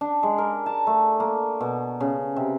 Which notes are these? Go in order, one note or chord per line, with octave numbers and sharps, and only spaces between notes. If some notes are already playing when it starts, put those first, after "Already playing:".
D4
G#3
A#4
A5
A3
A#3
B2
C#3
C3